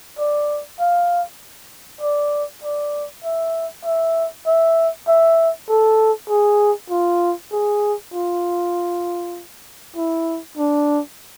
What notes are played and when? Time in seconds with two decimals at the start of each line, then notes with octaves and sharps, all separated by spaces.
0.18 D5
0.80 F5
2.01 D5
2.63 D5
3.24 E5
3.84 E5
4.46 E5
5.08 E5
5.69 A4
6.29 G#4
6.90 F4
7.52 G#4
8.13 F4
9.96 E4
10.57 D4